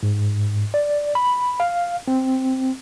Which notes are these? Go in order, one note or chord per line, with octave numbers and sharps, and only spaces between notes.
G#2
D5
B5
F5
C4